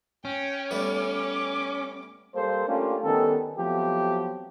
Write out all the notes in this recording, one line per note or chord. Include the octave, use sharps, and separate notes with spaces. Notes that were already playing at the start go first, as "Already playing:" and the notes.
C#4 G5
G3 A3 B3 D6
G3 A#3 A4 C5
A3 A#3 C#4 D4 F4 G4
D#3 G3 B3 C#4 A4
F3 F#3 A3 B3 C4 G4